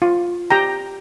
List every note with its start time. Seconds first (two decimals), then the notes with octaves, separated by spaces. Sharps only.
0.02 F4
0.50 G4 G5 A#5